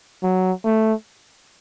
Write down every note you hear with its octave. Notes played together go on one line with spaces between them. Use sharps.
F#3
A3